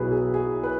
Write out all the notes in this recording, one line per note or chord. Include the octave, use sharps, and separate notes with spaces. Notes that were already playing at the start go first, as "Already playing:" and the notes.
Already playing: B1 B2 F#3 E4 G#4 B4
G#4
G#4
B4